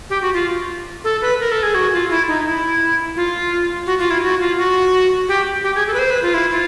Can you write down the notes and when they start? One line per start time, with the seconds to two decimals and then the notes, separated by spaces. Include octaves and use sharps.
0.10 G4
0.22 F#4
0.34 F4
1.04 A4
1.22 B4
1.40 A#4
1.51 A4
1.63 G#4
1.75 F#4
1.93 F4
2.10 E4
2.28 D#4
2.46 E4
3.16 F4
3.87 F#4
3.99 F4
4.10 E4
4.23 F#4
4.40 F4
4.57 F#4
5.28 G4
5.63 G4
5.75 G#4
5.87 A4
5.94 B4
5.99 C5
6.11 B4
6.22 F4
6.34 E4
6.52 F4